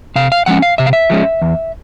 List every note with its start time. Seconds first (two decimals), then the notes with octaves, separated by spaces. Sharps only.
0.16 C3 F5
0.32 F5
0.46 F3 G#3 C#4 F#5
0.62 F5
0.78 C3 E5
0.86 F5
0.93 E5
1.10 F3 G#3 C#4
1.42 E2